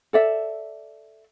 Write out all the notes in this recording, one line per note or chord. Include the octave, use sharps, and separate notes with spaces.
A4 D5 E5